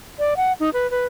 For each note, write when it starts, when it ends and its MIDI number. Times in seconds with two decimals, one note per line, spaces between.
0.19 0.34 74
0.37 0.53 78
0.60 0.70 63
0.73 0.90 71
0.91 1.06 71